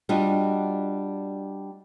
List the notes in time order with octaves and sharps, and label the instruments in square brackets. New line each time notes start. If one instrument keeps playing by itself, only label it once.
[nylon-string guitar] G3 D4 F4 F#4 D#5